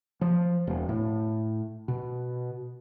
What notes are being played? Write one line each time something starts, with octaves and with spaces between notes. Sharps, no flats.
F3
E1
A2
B2